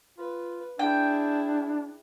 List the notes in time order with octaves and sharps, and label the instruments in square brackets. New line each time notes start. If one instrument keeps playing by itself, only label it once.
[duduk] F4 [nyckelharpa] B4
[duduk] D4 [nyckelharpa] E4 G#4 [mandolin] G5